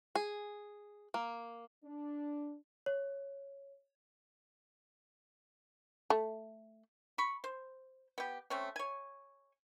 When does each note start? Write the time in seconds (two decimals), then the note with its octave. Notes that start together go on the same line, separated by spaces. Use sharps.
0.15 G#4
1.14 A#3
1.85 D4
2.86 C#5
6.10 A3
7.18 B5 C#6
7.44 C5
8.18 B3 G4
8.50 A3 C4 C#4
8.76 C#5 G#5